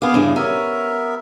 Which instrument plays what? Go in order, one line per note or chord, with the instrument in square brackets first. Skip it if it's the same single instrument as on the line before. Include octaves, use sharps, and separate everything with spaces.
[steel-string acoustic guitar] B3 F5 [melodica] G#4 D6
[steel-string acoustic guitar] G2 C#3 E3
[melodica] B3 A#4 E5 [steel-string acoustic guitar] C#4